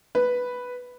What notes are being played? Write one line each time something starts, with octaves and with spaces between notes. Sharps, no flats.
B4